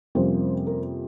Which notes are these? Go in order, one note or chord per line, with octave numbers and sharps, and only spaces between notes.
F2 C3 G3 A#3 C#4 C5
A#4